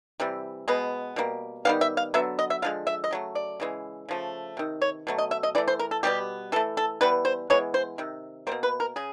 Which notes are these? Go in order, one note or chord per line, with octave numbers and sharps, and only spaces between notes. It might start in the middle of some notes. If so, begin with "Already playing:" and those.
C3 E3 G3
B2 G#3 B3
B2 G3 A#3
D#3 G3 B3 F5
E5
F5
D3 F#3 B3 E5
D#5
E5
D3 F3 G#3 F5
E5
D#5
C#3 F#3 A3
D5
C#3 E3 G#3
C#3 F3 A3
C3 D#3
C#5
B2 F#3 A3
D#5
E5
D#5
E3 A3 D5
C5
A#4
A4
B2 G3 B3 G4
E3 A3 A4
A4
E3 G3 B3 B4
C5
E3 G#3 B3 C#5
C5
C3 D#3
B2 G3 A#3 C5
B4
A#4
C#3 G#4